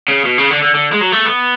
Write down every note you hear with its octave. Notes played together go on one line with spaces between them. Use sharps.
C#3
B2
C#3
D3
D3
D3
G#3
F#3
A3
B3